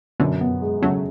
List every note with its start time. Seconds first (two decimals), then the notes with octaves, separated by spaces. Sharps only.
0.20 F#2 B2 D3
0.41 B3
0.62 G#3
0.82 C#3 F#3 A3